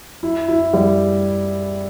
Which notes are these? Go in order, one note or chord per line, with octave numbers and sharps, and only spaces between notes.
E4
E4
G3